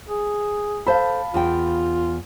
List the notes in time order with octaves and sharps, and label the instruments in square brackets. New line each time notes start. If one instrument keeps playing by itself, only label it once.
[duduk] G#4
[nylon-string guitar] A4 C5 [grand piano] F5 A5 B5
[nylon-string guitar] E2 G5 [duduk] F4